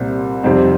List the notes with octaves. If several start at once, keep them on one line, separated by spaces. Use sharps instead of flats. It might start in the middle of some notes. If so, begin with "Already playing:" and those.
Already playing: C2 A#2 G3 C4
F2 C3 G3 C4 D#4